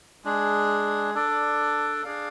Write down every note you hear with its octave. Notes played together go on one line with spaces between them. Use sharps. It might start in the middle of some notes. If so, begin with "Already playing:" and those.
G#3 D4 G#4
D4 A4 D5
D4 G#4 D5 F5